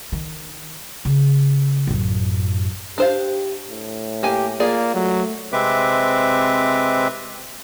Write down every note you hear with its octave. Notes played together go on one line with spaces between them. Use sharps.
D#3
C#3
A1 F#2
D4 G4 C5 F5
A2
A#3 G4 G#5
A#3 F4 G#4 D5
F#3 A3
C3 G#3 C4 B4 E5 D6